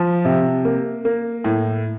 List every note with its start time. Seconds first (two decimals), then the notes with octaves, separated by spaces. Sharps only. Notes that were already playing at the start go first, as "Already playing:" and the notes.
Already playing: F3
0.25 C3
0.65 A#3
1.05 A#3
1.44 A2